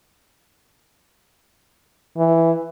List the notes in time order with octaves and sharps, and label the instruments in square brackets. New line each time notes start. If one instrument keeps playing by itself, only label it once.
[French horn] E3